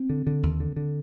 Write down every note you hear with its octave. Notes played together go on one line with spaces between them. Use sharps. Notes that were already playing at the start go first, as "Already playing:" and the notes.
Already playing: C4
D3
D3
D#2
D3
D3